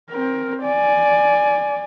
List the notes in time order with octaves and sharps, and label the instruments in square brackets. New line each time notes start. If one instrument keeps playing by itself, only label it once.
[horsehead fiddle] C4 A#4
D5 G#5